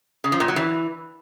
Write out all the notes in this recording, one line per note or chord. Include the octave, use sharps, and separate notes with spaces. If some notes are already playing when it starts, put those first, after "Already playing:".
C#3
F3
A#2
F#3
E3